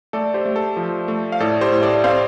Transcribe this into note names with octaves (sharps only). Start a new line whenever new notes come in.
A3 A4 D5
G4 C5
A3
A4
F3
A3
F5
A2 A4 D5
G4 C5
A2
A4 D5
C4 C5 F5